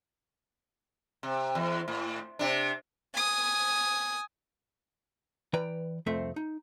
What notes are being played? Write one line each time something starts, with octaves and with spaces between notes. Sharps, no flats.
C3
E2
A2
C3 D4
G#5 D#6
E3 B4 D5 G5 A#5
C2 F2 A3 C4 C5 E5
D#4